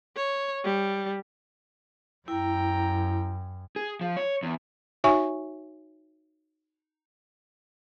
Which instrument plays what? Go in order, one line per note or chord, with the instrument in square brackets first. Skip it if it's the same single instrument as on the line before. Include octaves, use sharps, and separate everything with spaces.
[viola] C#5
G3
[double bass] F#2 [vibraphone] E4 [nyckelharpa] G5 A#5
[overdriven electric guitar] G#4
F3
C#5
E2
[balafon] D#4 F#4 C#5 E5 G#5 C#6